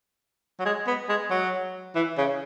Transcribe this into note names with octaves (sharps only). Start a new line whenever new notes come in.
F#3
G#3
B3
G#3
F#3
E3
C#3